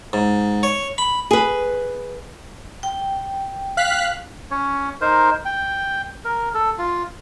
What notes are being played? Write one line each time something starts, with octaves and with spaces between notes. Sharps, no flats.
G#2
C#5
B5
G#4 B4
G5
F5 F#6 B6
C#4 C#5
D#4 A#4 C5
G5
A#4
A4
F4